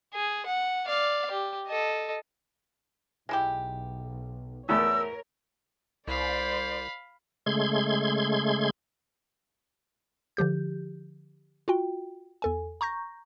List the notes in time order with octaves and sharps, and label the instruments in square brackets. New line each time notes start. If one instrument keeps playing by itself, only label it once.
[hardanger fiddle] G#4
F#5
D5 F5
G4
A4 D#5
[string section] B1 [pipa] G#3 E4 G4
[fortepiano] E2 A3 [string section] A#4 C#5 [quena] E6
[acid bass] C2 [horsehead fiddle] C5 D5 [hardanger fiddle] F5 B5
[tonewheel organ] C#3 G#3 A3 C6 G#6
[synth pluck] D3 F3 G4 G6
F4 F#4 G5
E2 A4 G#5
A#5 C#6 G6 A#6